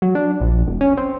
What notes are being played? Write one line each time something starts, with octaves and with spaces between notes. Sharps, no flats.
F#3
D4
A#1
E1
C#4
C4